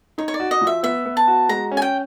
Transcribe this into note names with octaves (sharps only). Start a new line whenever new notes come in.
D#4 C#5
C#5
D5
F#4
D#5
F3
E5
B3 E5
B3
A5
F#4
G#3 A#5
C#4
G#5
G5